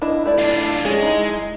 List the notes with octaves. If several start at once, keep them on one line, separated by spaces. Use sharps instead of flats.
D4 E4 D#5
A3 E4 D5
D4 F4
G#3 C#4 G#4
D#4 E4